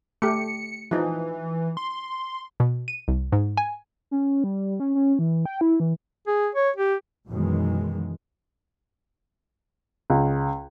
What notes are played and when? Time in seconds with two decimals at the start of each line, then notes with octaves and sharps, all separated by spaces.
0.22 A3 G4 C#7
0.91 E3 F3 D#4
1.77 C6
2.60 B2
2.88 D#7
3.08 C2
3.32 G#2
3.57 G#5
4.11 C#4
4.44 G3
4.80 C#4
4.95 C#4
5.19 E3
5.45 G5
5.61 E4
5.80 E3
6.27 G#4
6.55 C#5
6.76 G4
7.28 F#2 B2 D#3 E3 G#3
10.10 C#2